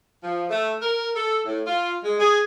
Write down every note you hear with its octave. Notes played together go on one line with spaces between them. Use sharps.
F3
A3
A#4
A4
A2
F4
G#3
G#4